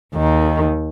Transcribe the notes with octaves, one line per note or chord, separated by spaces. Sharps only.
D#2 D#3